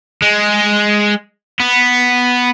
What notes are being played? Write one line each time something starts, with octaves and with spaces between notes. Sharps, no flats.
G#3
B3